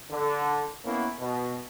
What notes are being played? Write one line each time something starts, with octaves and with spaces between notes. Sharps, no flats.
D3
A#3 B3 C#4 E4
B2